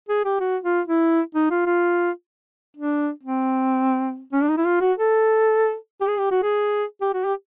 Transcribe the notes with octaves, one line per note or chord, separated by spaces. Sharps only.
G#4
G4
F#4
F4
E4
D#4
F4
F4
D4
C4
C#4
D4
D#4
E4
F4
F#4
A4
G4
G#4
G4
F#4
G#4
G4
F#4
G4